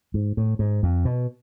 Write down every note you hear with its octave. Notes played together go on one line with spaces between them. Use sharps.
G#2
A2
G#2
F2
B2